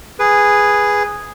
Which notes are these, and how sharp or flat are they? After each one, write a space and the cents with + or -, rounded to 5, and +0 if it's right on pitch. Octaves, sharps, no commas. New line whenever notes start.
G#4 -5 B4 +0